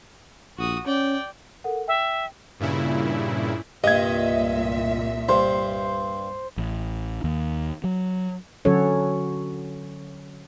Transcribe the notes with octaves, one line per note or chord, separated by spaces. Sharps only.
A#1 F#4 D#6
C#4 D5 G5
A4 A#4 F#5
E5 G5
G2 A#2 C#3 E4
C2 G2 A#2 D#5 E5 G#6
G2 C5
A1
D#2
F#3
D3 F#3 C#4 F#4 A4 C#5